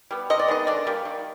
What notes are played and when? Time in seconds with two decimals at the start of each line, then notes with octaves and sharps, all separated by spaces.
0.11 G3 B3
0.30 C3 D#5
0.40 D5
0.48 D#3 G#3 B3 D#5
0.67 D3 D5
0.87 G3 A#3
1.05 D#3